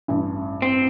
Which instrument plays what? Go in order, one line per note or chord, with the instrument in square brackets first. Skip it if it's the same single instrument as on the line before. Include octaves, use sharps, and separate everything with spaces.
[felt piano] A1 G2
[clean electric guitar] C4